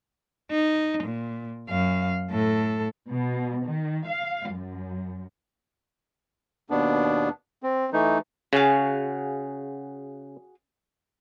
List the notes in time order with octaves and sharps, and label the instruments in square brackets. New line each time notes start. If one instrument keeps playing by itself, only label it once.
[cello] D#4
A#2
F#2 F5
A2 A4
[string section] B2
D#3
F5
F#2
[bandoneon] D#2 B2 B3 D4
C4
E3 A3 D#4
[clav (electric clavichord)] C#3 [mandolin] F#4 G#4 F5